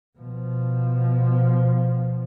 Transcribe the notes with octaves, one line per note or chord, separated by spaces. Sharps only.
B2 F3